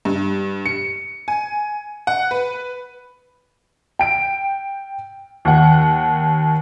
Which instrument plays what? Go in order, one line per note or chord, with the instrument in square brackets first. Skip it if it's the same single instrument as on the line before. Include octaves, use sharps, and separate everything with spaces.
[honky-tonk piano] G2
C#7
G#5
F#5
B4
G5 D7
D#2 F#5